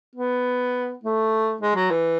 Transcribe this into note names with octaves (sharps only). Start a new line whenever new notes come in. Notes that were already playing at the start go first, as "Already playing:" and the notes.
B3
A3
G#3
F#3
E3